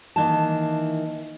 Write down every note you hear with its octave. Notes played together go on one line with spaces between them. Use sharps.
D#3 E3 A#3 E4 A5